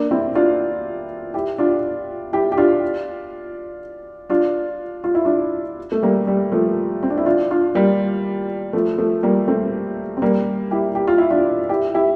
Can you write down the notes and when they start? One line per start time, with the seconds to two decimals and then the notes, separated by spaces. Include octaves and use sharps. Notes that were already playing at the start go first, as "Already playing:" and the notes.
Already playing: A#3 D4
0.11 C4 E4
0.35 D4 F4
1.34 E4 G4
1.58 D4 F4
2.33 E4 G4
2.52 G4
2.57 D4 F4
4.30 D4 F4
5.04 F4
5.15 E4
5.25 D4 F4
5.92 A3
6.03 G3 A#3
6.27 G3
6.52 F3 A3
7.03 C4
7.10 D4
7.18 E4
7.25 D4 F4
7.51 D4 F4
7.75 G3 A#3
8.73 F3 A3
8.98 F3 A3
9.23 G3 A#3
9.48 A3 C4
10.17 C4
10.22 G3 A#3
10.71 E4 G4
10.95 G4
11.07 F4
11.18 E4
11.30 D4 F4
11.69 E4 G4
11.94 E4 G4